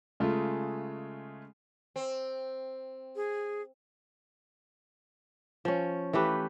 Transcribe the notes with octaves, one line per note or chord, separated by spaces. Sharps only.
C#3 G#3 A3 F4
C4
G#4
F3 C#4
E3 A3 G4 B4